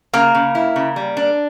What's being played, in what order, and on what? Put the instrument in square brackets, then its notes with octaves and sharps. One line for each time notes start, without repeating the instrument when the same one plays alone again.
[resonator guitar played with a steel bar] C#3 [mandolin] A#3 A#4
[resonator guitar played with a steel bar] C#3
E4
C#3
G3
D4